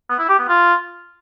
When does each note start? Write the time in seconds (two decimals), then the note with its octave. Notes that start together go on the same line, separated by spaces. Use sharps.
0.09 B3
0.19 E4
0.29 G4
0.39 B3
0.48 F4